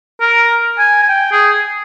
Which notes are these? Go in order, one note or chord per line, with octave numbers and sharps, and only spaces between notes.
A#4
G#5
G#5
G5
G#4